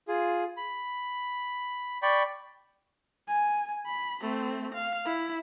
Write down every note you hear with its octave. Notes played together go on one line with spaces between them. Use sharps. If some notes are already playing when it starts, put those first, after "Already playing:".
F4 G#4
B5
D5 G5 B5 C#6
G#5
B5
A3 C4
F5
E4